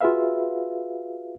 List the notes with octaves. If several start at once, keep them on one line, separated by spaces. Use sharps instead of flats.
F4 F#4 G#4 B4 E5 F5